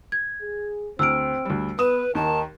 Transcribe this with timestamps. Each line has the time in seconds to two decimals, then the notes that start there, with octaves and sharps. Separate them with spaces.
0.12 G#6
0.42 G#4
0.99 D2 C4 E6 F6 D7
1.45 D2 G3
1.79 B3 B4 D#6 E7
2.15 D#2 D#3 A5